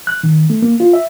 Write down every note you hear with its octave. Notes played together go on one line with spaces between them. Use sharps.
F#6
D#3
A3
A#3
F4
E5